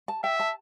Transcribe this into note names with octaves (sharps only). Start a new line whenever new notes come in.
A5
E5 G5
A5